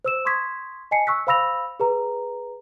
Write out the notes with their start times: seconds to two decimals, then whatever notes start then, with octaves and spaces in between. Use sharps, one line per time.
0.05 C5 E6 E7
0.25 C6 C#6 D#6 G#6 B6
0.91 D#5 G#5 A5 C7 C#7
1.07 C#6 E6 F#6 B6
1.27 C5 F5 B5 E6 A#6 F7
1.80 G#4 B4 A#5